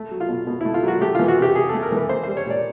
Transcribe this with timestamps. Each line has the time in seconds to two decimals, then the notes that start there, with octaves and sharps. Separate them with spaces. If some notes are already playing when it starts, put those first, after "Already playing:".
Already playing: A3
0.11 F#3
0.20 F4
0.29 B2
0.47 B2
0.61 E4
0.65 A3
0.74 F4
0.83 F#3 F#4
1.01 A3 G4
1.15 F4
1.19 E3
1.28 F#4
1.38 C3 G4
1.55 C3 G#4
1.69 A4
1.73 A3
1.82 A#4
1.92 E3 B4
2.09 A#3 C5
2.23 C5
2.28 G3
2.37 C#5
2.46 A#2 D5